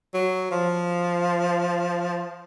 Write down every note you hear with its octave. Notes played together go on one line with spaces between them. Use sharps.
F#3
F3